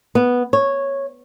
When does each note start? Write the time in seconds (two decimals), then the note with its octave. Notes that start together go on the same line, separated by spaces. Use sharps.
0.15 B3
0.53 C#5